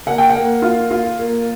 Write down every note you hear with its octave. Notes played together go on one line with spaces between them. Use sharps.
A#3 F#5
G5
F#5
A#3
F4
F4
A#3